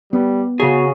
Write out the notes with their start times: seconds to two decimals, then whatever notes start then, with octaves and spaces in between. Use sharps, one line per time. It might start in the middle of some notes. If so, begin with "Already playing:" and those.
0.13 G3 B3
0.60 C#3 F#4 G#4 C#5